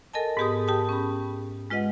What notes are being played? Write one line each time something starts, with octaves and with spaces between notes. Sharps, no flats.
A4 A#4 D#5 G#5 A5
G#2 B3 G4 G#4 D#6
G4 G5 A5 D#6
C#4 B5
G#3 F4 B4 D#5 F#5